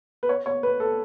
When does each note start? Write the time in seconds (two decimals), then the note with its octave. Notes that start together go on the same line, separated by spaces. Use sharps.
0.23 B4
0.29 C#5
0.46 C#5
0.63 B4
0.80 A4